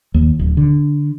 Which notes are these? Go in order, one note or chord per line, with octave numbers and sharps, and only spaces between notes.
D#2
D1
D3